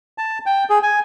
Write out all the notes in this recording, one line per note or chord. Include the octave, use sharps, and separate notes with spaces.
A5
G5
G#4
G#5